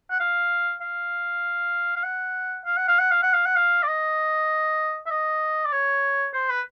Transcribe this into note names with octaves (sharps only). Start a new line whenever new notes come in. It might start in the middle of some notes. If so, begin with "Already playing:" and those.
F#5
F5
F5
F5
F#5
F5
F#5
F5
F#5
F5
F#5
F5
F#5
F5
D5
D#5
E5
D#5
D5
C#5
C5
B4